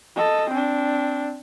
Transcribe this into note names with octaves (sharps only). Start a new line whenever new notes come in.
A4 D#5
C4 D4